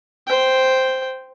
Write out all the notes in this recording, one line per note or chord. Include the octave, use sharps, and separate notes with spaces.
C5 G5